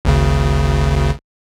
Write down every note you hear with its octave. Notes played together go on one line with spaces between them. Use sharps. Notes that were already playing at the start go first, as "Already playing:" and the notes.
G#1 D2 C#3